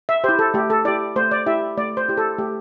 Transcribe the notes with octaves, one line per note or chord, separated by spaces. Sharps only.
E5
E4 G4 C5
A4
A3 G4
A4
E4 G4 D5
A3 C5
D5
E4 G4 E5
A3 D5
C5
E4 G4
A4
A3 G4